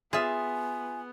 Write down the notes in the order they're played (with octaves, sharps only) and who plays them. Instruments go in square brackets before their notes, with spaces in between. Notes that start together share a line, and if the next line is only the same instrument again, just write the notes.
[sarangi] B3 [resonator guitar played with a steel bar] F4 E5 [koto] G#4 [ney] G#5